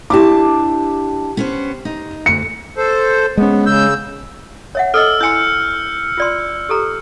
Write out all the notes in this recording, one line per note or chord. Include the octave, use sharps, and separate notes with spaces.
D4 E4 G4 A5 D6
B3 C#4 C5
D#4
D2 C#7
A4 C5
G#3 B3 C#4
C#3 E6 G6
C#5 E5 F#5
A4 D#5 E6 F6
E4 G#5 C6 G6 C#7
F4 D5 C6
G4 A4 A#5